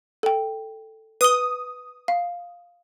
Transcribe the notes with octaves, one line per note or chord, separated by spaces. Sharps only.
A4 G5
B4 D#6 G7
F5